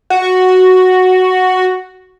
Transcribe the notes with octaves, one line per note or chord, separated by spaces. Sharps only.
F#4